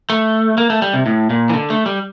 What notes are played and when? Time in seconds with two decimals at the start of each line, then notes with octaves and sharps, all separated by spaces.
0.10 A3
0.58 A#3
0.70 A3
0.82 G3
0.94 C3
1.06 A2
1.30 A#2
1.50 E3
1.54 D3
1.70 A3
1.86 G3